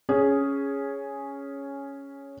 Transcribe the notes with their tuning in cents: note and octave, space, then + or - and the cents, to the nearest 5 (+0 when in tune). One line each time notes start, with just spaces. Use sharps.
C#4 +0 G#4 +0